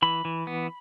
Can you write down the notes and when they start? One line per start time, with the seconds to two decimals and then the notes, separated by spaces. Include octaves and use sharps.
0.02 E3 B5
0.25 E3
0.47 B3